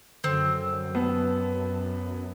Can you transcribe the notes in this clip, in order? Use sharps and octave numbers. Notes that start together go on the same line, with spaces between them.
F#2 D3 C4
B3 A5